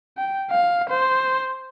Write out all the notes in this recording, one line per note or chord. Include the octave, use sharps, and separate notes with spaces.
G5
F5
C5